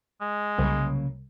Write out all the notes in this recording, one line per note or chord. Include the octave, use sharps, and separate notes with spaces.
G#3
C2 C#3 F#3 A#3